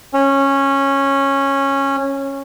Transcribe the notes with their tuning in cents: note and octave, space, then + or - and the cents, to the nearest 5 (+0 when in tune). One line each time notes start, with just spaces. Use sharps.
C#4 -10